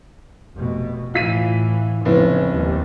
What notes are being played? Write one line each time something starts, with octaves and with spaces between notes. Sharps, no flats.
F1 B2
A2 E3 F4 B6 D#7
F1 C#3 B3 E4
D#2 G3